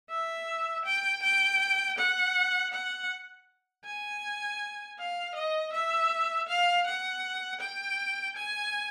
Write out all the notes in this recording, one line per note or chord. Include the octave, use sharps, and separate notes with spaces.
E5
G5
G5
F#5
F#5
G#5
F5
D#5
E5
F5
F#5
G5
G#5